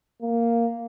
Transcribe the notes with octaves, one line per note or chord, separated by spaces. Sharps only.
A#3